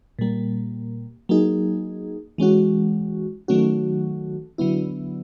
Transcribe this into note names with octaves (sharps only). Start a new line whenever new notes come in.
A#2 G3 A#3
F#3 A#3 D#4 G#4
E3 G#3 C#4 F#4
D#3 F#3 A3 C#4 F#4
D3 F#3 B3 E4